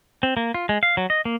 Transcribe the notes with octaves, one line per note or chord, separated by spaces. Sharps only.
C4
A#3
F4
G#3
F5
F#3
D#5
A#3